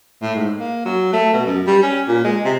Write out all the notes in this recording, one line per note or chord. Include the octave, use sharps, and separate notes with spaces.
A2
G#2
A#3
F#3
A3
B2
F#2
G3
C#4
A#2
G#3
C3